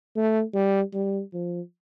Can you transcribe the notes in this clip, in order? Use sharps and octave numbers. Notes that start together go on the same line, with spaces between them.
A3
G3
G3
F3